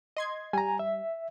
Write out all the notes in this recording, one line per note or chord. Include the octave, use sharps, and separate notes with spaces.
D#5 C6 G#6
G3 G#5 A#5
E5